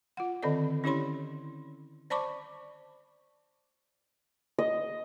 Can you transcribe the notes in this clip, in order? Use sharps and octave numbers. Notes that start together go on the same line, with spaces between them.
F4 F#5
D3 D#3 C4 A4 D5 D#5
C#4 E4 G4 C#5 B5 C6
C5 D5 A5 B5 C#6 D6
D#5